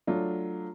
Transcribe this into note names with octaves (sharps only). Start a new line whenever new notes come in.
F#3 A3 D4 F4